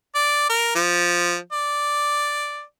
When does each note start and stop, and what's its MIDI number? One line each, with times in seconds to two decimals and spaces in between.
0.15 0.48 74
0.50 0.73 70
0.75 1.37 53
1.52 2.62 74